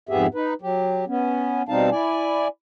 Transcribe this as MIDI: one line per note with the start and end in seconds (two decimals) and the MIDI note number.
0.09 0.27 41
0.09 0.27 44
0.09 0.27 59
0.09 0.27 67
0.09 0.27 68
0.09 0.27 76
0.34 0.54 63
0.34 0.54 71
0.62 1.05 54
0.62 1.05 67
1.07 1.62 59
1.07 1.62 61
1.69 1.90 47
1.69 1.90 55
1.69 1.90 60
1.69 1.90 63
1.69 1.90 77
1.69 1.90 81
1.92 2.48 64
1.92 2.48 74
1.92 2.48 80